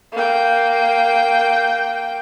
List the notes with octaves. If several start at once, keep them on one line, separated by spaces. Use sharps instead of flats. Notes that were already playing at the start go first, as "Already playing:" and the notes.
A#3 G5